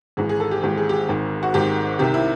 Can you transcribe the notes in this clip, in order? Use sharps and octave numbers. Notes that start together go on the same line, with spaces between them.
G#1 G#2 E3 G#4
G#4
A4
G4
G#1 G#2 E3 G4
G#4
G4
G#4
G#1 G#2 D#3
F#4
G#1 G#2 D#3 G4
C2 C3 D#3 G4
E4